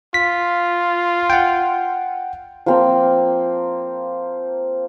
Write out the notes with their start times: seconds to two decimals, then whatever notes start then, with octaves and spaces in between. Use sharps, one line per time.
0.14 F4 B6
1.30 F#5 G5
2.66 F3 A#3 C4